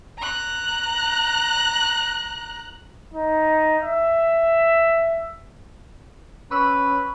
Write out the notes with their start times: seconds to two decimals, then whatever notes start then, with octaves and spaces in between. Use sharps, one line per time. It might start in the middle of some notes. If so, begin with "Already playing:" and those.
0.18 A#5 F#6
3.13 D#4
3.83 E5
6.51 C#4 B4 B5 C#6 E6